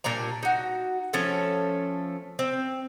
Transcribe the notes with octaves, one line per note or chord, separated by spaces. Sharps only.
A#2 G3 D4 A#5
D#4 F#4
F3 A3 C#4 A4
C4